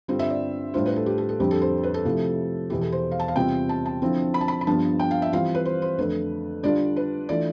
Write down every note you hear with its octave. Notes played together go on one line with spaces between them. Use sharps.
G2 D3 G3 C4 F4 C5
E5
D5
A2 G3 D4 F4 C5
B4
A4
G4
A4
A4
F2 D3 G3 C4 G4
A4
C5
B4
A4
C3 F3 A3 E4
E2 B2 B3 E4 G4
A4
C5
F5
A5
F5
E2 C3 G3 C4 F4 G5
A5
A5
D3 F3 C4 E4
B5
A5
B5
B5
G2 F3 B3 D4 F4 A5
G5
F5
E5
E3 G3 C4 F4 F5
B4
C5
C5
F2 D3 A3 D4 B4
D3 G3 D4 F4 D5
B4
E3 A3 D4 F4 D5